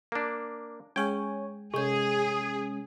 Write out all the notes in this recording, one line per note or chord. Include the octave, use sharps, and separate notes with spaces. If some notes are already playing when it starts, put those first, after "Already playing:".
A#3 D4
G#3 C#4 G#4 C#5 G5 G#5
C3 G#3 C#4 G#4 G6